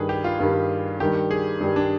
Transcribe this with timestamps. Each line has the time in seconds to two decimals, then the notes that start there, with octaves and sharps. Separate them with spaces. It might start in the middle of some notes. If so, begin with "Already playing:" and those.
Already playing: G2 D#3 G3 G#4 B4
0.09 G4
0.24 F4
0.39 G2 D#3 G3 F4
1.00 G2 D#3 G3 G4
1.31 G#4
1.60 G2 D#3 G3
1.76 D4